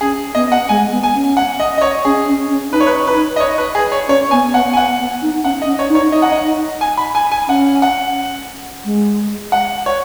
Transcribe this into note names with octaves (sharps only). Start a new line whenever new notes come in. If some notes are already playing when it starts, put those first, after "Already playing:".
C#4 G#4
B3 D#5
F#5
G#3 G#5
B3
G#5
C#4
F#5
D#5
D#5
C#5
C#4 G#4
C#4
C#4
D#4 B4
C#5
B4
B4
D#5
C#5
B4
G#4
C#5
C#4 C#5
B3 G#5
B3 F#5
G#5
B3 F#5
B3
D#4
C#4 F#5
D#5
C#4
C#5
D#4
C#5
D#4 D#5
F#5
D#5
G#5
B5
G#5
G#5
C#4 F#5
F#5
G#3
F#5
C#5